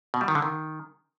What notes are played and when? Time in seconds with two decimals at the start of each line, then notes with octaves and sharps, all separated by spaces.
0.14 B2
0.21 G3
0.28 D#3
0.35 D3
0.42 D#3